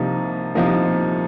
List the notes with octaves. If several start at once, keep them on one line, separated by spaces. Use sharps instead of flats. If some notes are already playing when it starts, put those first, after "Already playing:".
Already playing: C2 C3 F3 A#3 D#4
C2 C3 F3 A#3 D#4